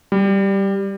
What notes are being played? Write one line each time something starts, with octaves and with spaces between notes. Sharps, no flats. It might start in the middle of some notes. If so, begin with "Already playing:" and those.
G3